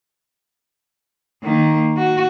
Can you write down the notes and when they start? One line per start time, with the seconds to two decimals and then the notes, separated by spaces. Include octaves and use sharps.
1.43 D#3 A#3
1.97 F#4